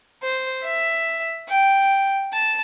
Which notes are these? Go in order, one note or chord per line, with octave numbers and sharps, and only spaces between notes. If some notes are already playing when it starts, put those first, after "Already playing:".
C5
E5
G5
A5